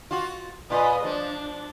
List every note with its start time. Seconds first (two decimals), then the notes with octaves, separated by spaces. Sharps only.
0.11 F4 F#4
0.70 A#2 F4 B4 D#5
1.04 F3 D4